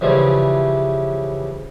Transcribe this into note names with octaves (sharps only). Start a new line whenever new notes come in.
C#3 E3 F3 G3